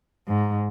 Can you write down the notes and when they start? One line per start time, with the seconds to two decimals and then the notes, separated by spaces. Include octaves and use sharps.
0.28 G#2